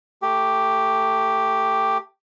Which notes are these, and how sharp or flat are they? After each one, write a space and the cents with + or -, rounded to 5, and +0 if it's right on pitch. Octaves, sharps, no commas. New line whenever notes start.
A3 +15 G4 +0